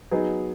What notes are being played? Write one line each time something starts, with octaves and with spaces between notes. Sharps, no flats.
F#3 B3 D#4 G#4